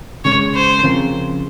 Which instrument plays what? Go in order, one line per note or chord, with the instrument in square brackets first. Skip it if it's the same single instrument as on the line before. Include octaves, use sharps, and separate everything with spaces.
[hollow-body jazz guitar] C#3 G#3 C#4 [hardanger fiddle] C#5
[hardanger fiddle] C5
[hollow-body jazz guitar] C#3 F3 C4 F4 A#4